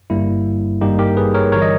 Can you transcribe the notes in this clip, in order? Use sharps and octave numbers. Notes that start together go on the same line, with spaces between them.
G1 G2 G3 A#3 E4
G#1 G2 G3 A#3 D#4 G4
G4 A#4
G#4 B4
A#4 C#5
G1 E3 G3 A#4 C#5
D#5